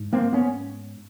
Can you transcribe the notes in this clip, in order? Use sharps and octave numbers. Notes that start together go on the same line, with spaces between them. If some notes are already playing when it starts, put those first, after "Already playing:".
Already playing: G#2
A#3 C4
B3 C#4